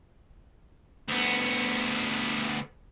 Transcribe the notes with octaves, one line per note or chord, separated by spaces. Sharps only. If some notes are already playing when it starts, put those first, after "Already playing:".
D2 B3